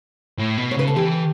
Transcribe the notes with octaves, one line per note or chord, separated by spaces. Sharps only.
A2
B2
C#5
C#3 B4
A4
E3 G4